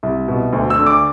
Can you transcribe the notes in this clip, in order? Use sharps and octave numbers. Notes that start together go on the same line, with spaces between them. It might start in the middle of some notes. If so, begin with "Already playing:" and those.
C2
B2
D2
E6
D3
D6